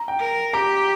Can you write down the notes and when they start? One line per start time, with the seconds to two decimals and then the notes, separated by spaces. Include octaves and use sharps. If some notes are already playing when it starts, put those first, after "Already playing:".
Already playing: A#5
0.08 G5
0.20 A#4
0.53 G4 A#5